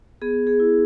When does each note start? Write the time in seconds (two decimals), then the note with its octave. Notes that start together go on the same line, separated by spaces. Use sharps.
0.22 B3 G#4
0.47 G#4
0.60 E4